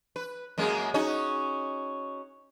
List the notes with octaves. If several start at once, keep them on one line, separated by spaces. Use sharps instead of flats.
B4
F#2 G#3 A#3
C#4 D#4 F#4